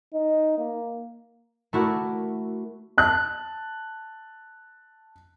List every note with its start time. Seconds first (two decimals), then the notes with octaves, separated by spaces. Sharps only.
0.13 D#4
0.58 A#3
1.73 A3 E4 F#4 A#4 D5
2.98 A5 F#6